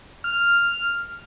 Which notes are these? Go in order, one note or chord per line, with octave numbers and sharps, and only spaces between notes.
F6